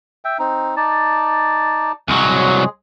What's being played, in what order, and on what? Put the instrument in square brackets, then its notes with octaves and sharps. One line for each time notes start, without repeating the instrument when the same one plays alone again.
[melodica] E5 G5
C4 D#4
D#4 D5 A5
[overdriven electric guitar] C2 F#3 [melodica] G#3 G#4